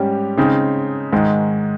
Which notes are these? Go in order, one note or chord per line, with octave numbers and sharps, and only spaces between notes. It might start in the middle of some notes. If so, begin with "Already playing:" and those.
Already playing: G#2 G3 C#4 G4
C#3 G#3 C4 D#4
G#2 D#3 G#3